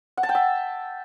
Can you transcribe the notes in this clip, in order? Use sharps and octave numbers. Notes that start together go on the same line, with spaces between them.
F#5
A5
G5
E5